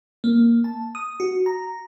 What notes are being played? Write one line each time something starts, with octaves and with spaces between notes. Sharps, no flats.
A#3
A5
D#6
F#4
A#5